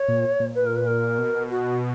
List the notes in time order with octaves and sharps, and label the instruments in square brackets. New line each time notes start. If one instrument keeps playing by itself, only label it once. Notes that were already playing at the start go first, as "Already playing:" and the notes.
Already playing: [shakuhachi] C#5
[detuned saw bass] A#2
A#2
[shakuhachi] B4
A#4
B4
A#4
[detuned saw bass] B2
[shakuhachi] F#4